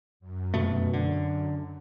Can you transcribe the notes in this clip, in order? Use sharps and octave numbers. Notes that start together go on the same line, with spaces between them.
F#2
F1 B2 A3
D3